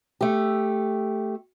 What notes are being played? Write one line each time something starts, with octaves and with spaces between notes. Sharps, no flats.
A3 G4